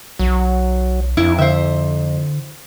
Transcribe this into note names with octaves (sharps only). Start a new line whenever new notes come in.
B1 F#3
F2 E4
D3 C5 E5